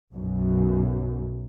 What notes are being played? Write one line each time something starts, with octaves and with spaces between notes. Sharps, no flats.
B1 F#2